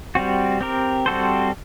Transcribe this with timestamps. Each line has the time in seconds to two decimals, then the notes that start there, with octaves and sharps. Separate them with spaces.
0.15 G3 C4 F#4
0.61 C4 G4 A#4
1.06 G3 C4 F#4 A4 C5